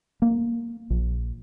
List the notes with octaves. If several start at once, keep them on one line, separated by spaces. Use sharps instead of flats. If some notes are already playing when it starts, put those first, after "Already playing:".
A#3
A#1